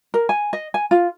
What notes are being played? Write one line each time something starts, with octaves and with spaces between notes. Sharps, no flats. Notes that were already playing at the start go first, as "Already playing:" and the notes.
A#4
G#5
D#5
G#5
F4